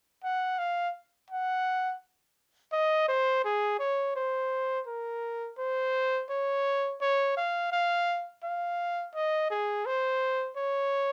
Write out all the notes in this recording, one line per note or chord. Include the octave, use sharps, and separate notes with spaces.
F#5
F5
F#5
D#5
C5
G#4
C#5
C5
A#4
C5
C#5
C#5
F5
F5
F5
D#5
G#4
C5
C#5